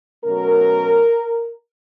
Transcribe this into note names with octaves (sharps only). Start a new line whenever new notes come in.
B2 F#3 A3 C#4 A#4